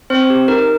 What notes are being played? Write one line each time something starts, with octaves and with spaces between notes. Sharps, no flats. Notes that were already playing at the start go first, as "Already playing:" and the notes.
C4 C5
G4
D#4 A#4